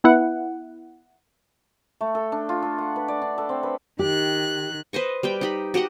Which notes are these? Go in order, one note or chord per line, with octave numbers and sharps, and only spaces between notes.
B3 E4 F#5
A3
A4
D4
F4
A4
F#5
B4
D5
D4
A4
C4
B4
D#3 G4 F#6
B4 C5 D#5 C#6
G3 B4 G5
D#4 G4 B5
F#4 G4 D#5 F#5